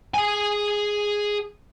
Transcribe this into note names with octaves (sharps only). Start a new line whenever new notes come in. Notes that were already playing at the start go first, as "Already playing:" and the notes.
G#4 G#5